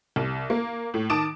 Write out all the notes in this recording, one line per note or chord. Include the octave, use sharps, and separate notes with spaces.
C2
A#3
A2
D#3 A5 D6 D#6 D7 E7